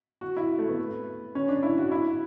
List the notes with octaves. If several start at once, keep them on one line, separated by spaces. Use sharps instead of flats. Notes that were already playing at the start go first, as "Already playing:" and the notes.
F#4
E4
A3
B3
C#4
D4
E4
F#4
E4